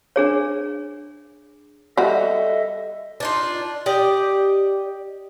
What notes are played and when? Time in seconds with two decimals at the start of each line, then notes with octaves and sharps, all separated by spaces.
0.16 D4 G#4 C#5
1.97 G3 F#4 A4 D#5 E5
3.20 D4 D#4 F4
3.86 G4 D5 D#5